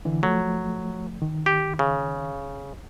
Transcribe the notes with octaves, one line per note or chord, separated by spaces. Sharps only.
D3 E3
F3 F#3 A3
D#3
G4
C#3